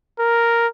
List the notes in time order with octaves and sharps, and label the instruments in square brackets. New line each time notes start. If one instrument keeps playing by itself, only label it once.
[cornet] A#4